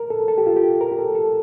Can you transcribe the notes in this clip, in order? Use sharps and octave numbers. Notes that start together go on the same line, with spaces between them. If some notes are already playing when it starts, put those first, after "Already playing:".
Already playing: A#4
A4
A4
G4
F4
G4
A#4
G4
A4
A4